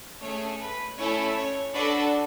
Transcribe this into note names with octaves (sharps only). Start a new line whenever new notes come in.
A3 C#4 G#4 C#5
B4
A3 C#4 E4 A4 C#5
C#5
D4 F#4 A4 B4 D5